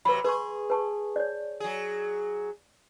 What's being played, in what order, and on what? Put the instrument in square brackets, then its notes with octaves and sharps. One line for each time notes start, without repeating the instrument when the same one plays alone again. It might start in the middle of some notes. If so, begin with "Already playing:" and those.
[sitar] C3 F#3 [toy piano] B4 B5
[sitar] G#4 [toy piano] B4 C6 C#6
[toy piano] B4 A5 C#6
C#5 D5
[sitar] F#3 G#4